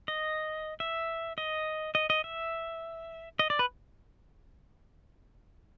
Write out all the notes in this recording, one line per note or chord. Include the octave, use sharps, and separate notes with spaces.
D#5
E5
D#5
D#5
D#5
E5
D#5
D5
B4